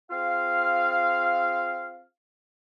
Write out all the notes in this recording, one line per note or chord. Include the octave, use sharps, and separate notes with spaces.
C4 F4 G#4 F5